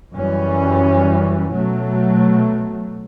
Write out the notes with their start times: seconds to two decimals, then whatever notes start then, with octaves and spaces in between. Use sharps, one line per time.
0.14 F#2 E3 G3 C#4
1.52 B2 F#3 A3